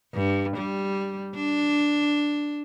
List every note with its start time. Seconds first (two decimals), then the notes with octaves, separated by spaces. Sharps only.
0.14 G2
0.57 G3
1.35 D4